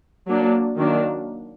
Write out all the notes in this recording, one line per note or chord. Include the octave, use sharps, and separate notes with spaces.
F#3 A#3 D4
D#3 F#3 A#3 D4